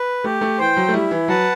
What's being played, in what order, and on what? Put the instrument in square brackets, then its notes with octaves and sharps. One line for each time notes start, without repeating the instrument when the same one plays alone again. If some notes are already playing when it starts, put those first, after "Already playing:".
Already playing: [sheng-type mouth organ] B4
[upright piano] A3 [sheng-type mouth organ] G4
[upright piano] A3
[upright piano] E3 [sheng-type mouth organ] C5 G5
[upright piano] F#3
A3
[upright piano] G3 [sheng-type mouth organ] E4
[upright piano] E3
[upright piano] F#3 [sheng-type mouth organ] B4 F#5 A5